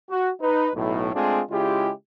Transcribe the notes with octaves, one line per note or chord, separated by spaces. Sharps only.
F#4
D#4 B4
B1 A2
G#3 A3 C4 D4 F4 G#4
C#3 G#3 E4 F4 G4